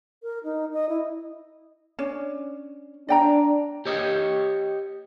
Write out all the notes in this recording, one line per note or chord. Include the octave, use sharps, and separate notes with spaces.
A#4
D#4
D#5
E4
C#4 D4
D4 D5 G5 A#5
G4 C#5 D#5